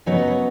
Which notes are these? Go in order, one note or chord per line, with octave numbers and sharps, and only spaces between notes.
C#3 F#3 B3 D#4 C#5
B4
C#5